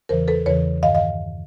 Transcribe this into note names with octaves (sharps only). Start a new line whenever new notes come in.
E2 C#3 E3 A#4 C5
A4 B4
E2 C#3 E3 B4 C#5
G2 D#3 D#5 F5
D#5 F5